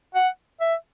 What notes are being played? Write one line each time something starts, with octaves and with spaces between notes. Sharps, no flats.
F#5
E5